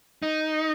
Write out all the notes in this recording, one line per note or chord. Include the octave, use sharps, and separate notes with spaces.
D#4